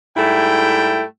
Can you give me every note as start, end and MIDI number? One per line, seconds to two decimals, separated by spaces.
0.17 1.04 44
0.17 1.04 55
0.17 1.04 57
0.17 1.04 64
0.17 1.04 79